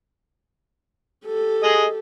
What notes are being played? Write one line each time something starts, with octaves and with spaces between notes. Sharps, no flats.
G4 A4
G#4 D#5